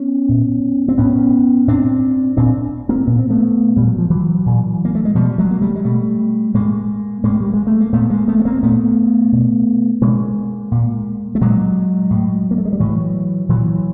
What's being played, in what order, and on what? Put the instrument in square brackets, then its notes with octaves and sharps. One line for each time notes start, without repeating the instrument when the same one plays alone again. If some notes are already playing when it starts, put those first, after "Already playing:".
Already playing: [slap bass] B3 C#4
A#2
C4
A2 B3 C#4
A2 C4 D4
A#2 C4 D4
A#3 C4
A#2 B3
C4
A3 B3
A#2 G3
F#3
F3
E3 F#3
A#2
A#3
A3
G#3
B2 F3 G3
F#3 G#3
A#3
G3 A3
G#3
B2 G3 A3
A2 G#3 A#3
A2 G#3 A#3
G3
G#3
A3
A#3
A#2 A3 B3
G#3 A#3
A3 B3
B3
A#3 C4
A#2 A3 B3
B2
B2 G#3 A#3
A#2
A3
A#2 F#3 G#3
A2
A#3
A3
G#3
G3
A2 E3 F#3
A#2 E3 F#3